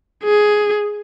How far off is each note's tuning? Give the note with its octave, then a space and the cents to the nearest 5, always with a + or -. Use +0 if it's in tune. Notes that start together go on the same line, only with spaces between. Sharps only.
G#4 +10